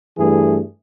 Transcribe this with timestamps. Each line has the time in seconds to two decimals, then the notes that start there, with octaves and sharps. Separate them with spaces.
0.18 G2 E3 A3 G#4